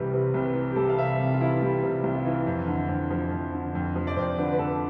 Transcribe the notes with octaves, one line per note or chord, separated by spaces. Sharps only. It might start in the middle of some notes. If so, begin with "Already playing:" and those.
Already playing: C2 C3 E3 G3 B4 C5
C3
C2 B4
E3
G4
G3 A4
F5
C3 E5
C2
F4
E3 E4
G3 E4
C3
C2 F4
F4
E3 E4
F2
D3
F2
F3
F2
D3
F2
F3
D5
F2 C5
D3 B4
B4
F2 A4